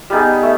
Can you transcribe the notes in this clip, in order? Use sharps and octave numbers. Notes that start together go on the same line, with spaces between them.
G3 B3 D#4 G#4
A3